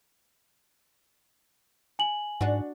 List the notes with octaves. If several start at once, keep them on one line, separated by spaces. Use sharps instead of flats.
G#5 F#7
G#2 D4 F#4